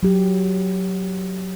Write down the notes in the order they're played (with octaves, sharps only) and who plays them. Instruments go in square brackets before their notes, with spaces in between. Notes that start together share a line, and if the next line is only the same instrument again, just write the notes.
[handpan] F#3 G4